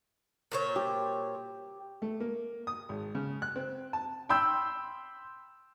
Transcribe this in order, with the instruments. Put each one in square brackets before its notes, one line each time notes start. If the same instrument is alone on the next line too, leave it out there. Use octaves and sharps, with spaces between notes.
[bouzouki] A#2 C5 C#5
[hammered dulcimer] G4
[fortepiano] A3
A#3
D#6
G#1
C#3
F#6
C4
A5
[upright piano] G5 B5 C6 E6 G6